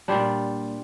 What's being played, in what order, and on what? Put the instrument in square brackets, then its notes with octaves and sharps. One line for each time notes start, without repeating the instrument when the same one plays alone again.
[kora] A#2 G3 D4 F4